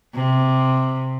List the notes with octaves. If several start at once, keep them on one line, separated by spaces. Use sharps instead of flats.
C3